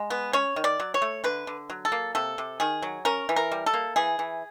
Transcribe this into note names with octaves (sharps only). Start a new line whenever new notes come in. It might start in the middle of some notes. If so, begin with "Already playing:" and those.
Already playing: G#3
B3
C#4 C#5
D#3
D5
F#3
C#5
A3
D3 B4
D3
F#3
A4
A#3
C3 A4
C3
D#3 G#4
F#3
C#4 A#4
E3
A#4
G3
A4
A#3
E3 G#4
E3